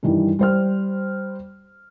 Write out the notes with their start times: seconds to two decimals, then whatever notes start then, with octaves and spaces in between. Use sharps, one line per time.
0.03 G2 D#3 E3 G3
0.39 G3 C5 F6